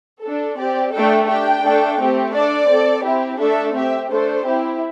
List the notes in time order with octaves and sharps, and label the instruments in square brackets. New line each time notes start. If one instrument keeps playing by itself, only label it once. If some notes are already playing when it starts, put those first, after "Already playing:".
[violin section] D4 A4
C4 G4 D5
A3 D4 A4 G5
D4 G4 G5
A3 D4 A4
A3 C4 G4
D4 A4 D5
C4 A4
C4 E4 G4
A3 D4 A4 E5
C4 G4 E5
A3 D4 A4 C5
C4 E4 G4